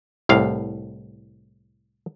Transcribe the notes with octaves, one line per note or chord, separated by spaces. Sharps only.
C2 A2 F5